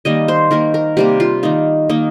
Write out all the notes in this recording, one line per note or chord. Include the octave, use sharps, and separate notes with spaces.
D#3 G3 A#3 D#5
C5
D#3 A#3 A#4
A#4
C3 G3 A#3 G4
F4
D#3 A#3 D#4
D#3 A#3 D#4